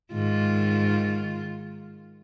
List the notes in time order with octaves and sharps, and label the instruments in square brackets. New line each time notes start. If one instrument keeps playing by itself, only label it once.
[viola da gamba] G#2 D#3 F4